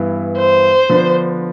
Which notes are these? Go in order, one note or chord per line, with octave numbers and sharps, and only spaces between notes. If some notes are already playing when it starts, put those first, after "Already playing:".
Already playing: G2 E3 B3 E4
C5
D3 F3 B3 D4